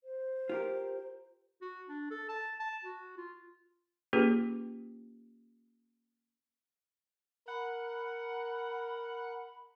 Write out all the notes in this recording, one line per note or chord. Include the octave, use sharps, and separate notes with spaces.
C5
F4 G4 A#4
F#4
D4
A4
A5
A5
F#4
F4
A#3 C#4 F4 G4 G#4 B4
A#4 F#5 B5